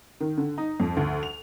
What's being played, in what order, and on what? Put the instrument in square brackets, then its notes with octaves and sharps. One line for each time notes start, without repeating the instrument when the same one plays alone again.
[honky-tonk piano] D#3
D3
D#4
F2
D2
F7